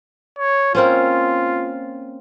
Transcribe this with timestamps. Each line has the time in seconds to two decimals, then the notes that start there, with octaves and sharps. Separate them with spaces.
0.39 C#5
0.75 A#3 C4 C#4 F4